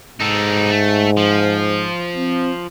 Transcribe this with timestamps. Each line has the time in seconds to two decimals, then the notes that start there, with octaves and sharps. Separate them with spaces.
0.20 G#2 D#4 A4
0.70 A3
1.17 F3
2.16 C4